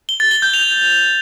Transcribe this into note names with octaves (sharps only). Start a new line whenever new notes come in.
G7
A6
G7
G6
F7